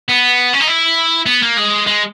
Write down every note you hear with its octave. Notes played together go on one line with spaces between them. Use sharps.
B3
C#4
D#4
E4
B3
A#3
G#3
G#3